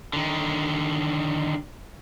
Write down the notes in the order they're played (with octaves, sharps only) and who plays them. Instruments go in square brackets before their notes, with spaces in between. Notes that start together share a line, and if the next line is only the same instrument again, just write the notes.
[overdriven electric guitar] D3 D#3